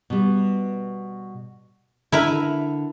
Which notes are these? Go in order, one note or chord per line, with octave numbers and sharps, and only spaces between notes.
B2 G3
D3 E4 A#4 B4